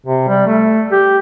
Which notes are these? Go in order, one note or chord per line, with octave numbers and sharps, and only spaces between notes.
C3
G3
A3
G4